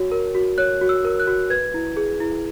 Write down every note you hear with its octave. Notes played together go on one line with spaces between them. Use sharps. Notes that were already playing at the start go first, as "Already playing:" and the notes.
Already playing: F#4 C#5
A#4
F#4
C#5 F#6
F#4
E6
A#4
F#6
F#4
B4 G#6
E4
G#4
E4